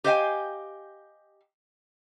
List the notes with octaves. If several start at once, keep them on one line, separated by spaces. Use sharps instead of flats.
G4 C5 D#5 F5 G5 G#5